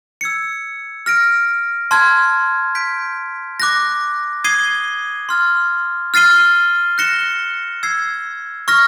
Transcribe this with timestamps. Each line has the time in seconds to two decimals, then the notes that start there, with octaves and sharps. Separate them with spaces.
0.21 E6 G#6 C#7
1.06 F6 A#6 D7
1.91 A5 C6 F6 G#6
2.75 G6 B6 D7
3.60 D6 F#6 A#6
4.44 D#6 G#6 C7 D#7 G7
5.29 C6 F6 A6
6.14 F6 A6 C7 D#7 G7
6.98 F#6 A#6 C#7 E7 G7
7.83 E6 G#6 C7
8.68 C#6 F6 A#6